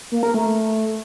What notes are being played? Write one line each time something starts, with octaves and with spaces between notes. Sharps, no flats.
A#3
A#4
A3